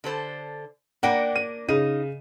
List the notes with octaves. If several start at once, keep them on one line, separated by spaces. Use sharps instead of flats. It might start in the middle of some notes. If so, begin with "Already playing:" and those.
D3 A4 C5
A#3 D4 A#4 F#5 G5
D#7
C#3 D#4 D#7